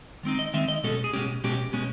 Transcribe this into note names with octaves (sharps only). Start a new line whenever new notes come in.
D#3 G#3 C4 D#4
D#5
D#3 G#3 C4 D#4 E5
D#5
B2 G#3 C#4 A4
G#4
B2 G#3 C#4 G4
B2 G#3 C#4 G4
B2 G#3 C#4